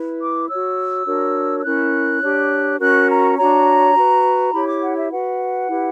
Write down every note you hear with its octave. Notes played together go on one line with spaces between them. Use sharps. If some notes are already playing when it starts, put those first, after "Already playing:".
Already playing: E4 B4
D6
F#4 C#5 E6
D4 F#4 A#4 C#5
E6
C#4 E4 A#4 F#6
D4 G4 C#5
C#4 F#4 A#4 F#6
A#5
D4 F#4 C#5 A#5
F#4 B4
E4 G4 C#5 B5
D6
F#5
E5
F#4 B4 F#5
E4 G4 B4